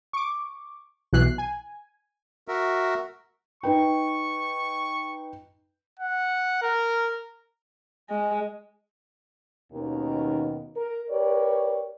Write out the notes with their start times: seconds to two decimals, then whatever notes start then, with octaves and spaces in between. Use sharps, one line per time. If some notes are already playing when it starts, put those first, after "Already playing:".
0.13 C#6 D6
1.13 B1 B2 E3 F#6 C7
1.38 G#5
2.48 F#4 A#4 E5
3.63 D#4 B4 G5 C#6
6.00 F#5
6.62 A#4
8.10 G#3
9.71 D#2 B2 D#3 C#4 D#4 A#4
10.75 A#4
11.10 G4 A#4 B4 C#5 D5